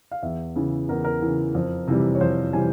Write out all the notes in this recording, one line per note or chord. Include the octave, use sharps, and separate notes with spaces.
F5
E2 E5
C#3 E3
E2 A#4
A#4
C#3 E3
F2
C3 E3 G3
C#5
F2 C5
C3 E3 G3 G#5